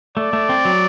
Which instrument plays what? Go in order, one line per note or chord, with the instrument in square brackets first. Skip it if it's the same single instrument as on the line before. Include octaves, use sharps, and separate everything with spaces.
[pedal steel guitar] A3 [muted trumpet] D5
[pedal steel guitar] A3
C4
F#3